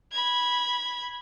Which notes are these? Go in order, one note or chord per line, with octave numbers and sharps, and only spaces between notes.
B5 G#6